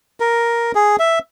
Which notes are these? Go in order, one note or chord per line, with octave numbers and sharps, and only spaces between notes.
A#4
G#4
E5